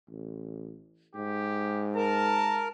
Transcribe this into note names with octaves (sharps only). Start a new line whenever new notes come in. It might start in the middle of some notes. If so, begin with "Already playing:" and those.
A1
G#2 G4
A#4 A5